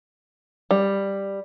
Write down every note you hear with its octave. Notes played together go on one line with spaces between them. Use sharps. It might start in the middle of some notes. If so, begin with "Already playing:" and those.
G3